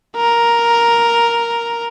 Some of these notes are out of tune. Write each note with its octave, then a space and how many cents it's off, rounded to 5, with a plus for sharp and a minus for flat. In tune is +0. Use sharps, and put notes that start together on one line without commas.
A#4 +5